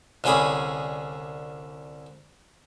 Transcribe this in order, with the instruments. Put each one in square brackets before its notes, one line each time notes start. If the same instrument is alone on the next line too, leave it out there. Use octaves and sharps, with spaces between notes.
[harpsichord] C2 D3 C#4 G#4 B5